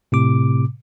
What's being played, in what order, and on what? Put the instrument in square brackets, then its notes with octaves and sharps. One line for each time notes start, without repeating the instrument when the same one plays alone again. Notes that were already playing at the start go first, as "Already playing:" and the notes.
[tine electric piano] A2 C3 D6